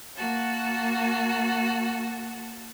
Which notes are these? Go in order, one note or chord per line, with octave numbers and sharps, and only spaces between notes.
A#3 F#4 A5